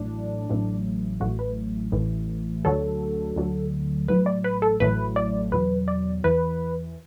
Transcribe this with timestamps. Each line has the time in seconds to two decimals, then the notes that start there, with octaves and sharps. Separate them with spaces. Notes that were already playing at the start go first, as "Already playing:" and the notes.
Already playing: A1 A2 F#3 D4
0.49 A1 A2 F#3
1.20 A1 A2 F#3 F#4
1.39 B4
1.92 A1 A2 E3
2.65 D2 D3 F#3 A4
3.36 D2 D3 F#3
4.08 A1 A2 F#3 B4
4.26 D5
4.44 B4
4.62 A4
4.80 A1 A2 F#3 B4
5.16 D5
5.52 E2 B2 F#3 B4
5.88 D5
6.24 E2 E3 B4